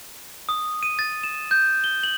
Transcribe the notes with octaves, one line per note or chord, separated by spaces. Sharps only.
D#6
D#7
A6
E7
G6
G7
F#7